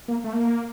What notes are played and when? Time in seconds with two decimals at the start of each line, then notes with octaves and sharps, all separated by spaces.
0.08 A#3
0.24 A3
0.33 A#3